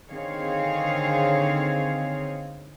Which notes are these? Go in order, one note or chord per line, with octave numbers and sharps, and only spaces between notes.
D3 D#3 C4 G#4 C#5 F5